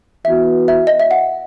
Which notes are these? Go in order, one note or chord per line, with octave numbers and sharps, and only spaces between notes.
E3 B3 F#4 E5
E5
D#5
E5
F#5